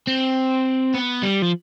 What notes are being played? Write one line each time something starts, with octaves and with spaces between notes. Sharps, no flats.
C4
B3
G3
F3